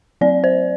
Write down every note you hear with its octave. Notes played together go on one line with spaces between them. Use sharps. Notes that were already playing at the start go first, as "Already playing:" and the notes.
F#3 C4 D5
C5